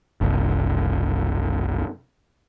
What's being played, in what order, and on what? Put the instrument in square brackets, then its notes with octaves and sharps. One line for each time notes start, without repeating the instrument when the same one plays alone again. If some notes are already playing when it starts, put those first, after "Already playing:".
[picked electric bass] F#1 C2